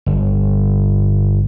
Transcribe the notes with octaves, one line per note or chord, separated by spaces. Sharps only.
G1